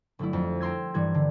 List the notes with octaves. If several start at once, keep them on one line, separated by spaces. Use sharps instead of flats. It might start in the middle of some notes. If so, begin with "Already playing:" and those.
G1 F#3 A3 E4
F2
G5 A#5 C6 E6 G#6
G2 E3 G3 G#6
D3